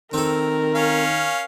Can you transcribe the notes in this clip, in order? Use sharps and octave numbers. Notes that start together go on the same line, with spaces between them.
D#3 C4 A4 A#4
C#4 F5